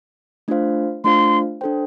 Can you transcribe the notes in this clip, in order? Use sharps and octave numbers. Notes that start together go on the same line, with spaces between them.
A3 D4 F4 C5 F5
A3 D4 F4 C5 F5 C6
D4 A4 C5 G5